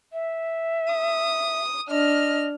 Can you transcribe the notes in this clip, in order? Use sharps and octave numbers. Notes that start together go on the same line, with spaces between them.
E5
D#6
D4 D#5 F6